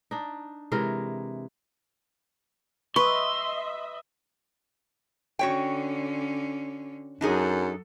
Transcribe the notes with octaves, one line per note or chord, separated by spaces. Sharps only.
D4 D#4
C3 E3 G#3 A#4
B4 D#5 E5 C6 C#6
D3 C#4 F#4 C#5 G5
F#2 F#3 D4 D#4 G#4 A4